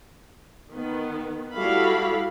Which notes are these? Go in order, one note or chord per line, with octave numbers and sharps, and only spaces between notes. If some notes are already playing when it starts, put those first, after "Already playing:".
D#3 B3
G3 E4 F#4 A4 F5 B5